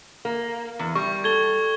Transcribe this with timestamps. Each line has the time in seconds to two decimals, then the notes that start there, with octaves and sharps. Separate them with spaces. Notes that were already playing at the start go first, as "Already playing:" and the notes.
0.25 A#3
0.79 E2
0.95 G3 C#6
1.24 A4 G#6 G7